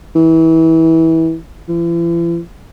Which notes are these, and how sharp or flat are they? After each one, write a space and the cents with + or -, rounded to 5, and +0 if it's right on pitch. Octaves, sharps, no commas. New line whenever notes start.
E3 -25
E3 +45